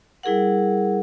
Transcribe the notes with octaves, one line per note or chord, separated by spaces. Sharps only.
G3 E4 G#4 A#4 F#5